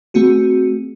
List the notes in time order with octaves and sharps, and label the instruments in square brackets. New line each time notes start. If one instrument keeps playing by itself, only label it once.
[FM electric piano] A3 C4 F#4 G#4